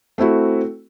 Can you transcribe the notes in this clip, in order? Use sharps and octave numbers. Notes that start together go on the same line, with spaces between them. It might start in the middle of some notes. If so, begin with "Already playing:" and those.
A3 C4 E4 F#4